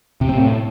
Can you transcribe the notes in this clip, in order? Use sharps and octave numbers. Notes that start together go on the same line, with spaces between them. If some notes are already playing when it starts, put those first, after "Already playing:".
C3
C4
A2